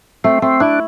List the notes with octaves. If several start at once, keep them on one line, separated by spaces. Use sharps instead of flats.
A3 C4
A3 C4
D4 E4